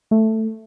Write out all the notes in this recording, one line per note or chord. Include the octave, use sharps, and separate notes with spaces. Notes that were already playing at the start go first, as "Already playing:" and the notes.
A3